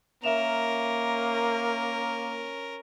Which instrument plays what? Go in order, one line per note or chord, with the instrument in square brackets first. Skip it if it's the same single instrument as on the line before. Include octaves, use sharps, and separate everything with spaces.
[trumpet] A#3 [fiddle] C#4 A#4 [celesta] E5 E7 F7